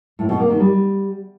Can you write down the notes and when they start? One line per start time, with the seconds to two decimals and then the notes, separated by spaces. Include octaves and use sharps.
0.19 A2
0.29 B2
0.39 A#3
0.49 D#3
0.60 G3